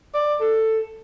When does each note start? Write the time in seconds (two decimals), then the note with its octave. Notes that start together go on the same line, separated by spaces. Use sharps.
0.14 D5
0.40 A4